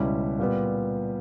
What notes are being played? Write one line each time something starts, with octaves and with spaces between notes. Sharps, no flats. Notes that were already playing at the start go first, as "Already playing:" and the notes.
Already playing: C#2 B2 G3 C#4 E4
A#2 G3 B3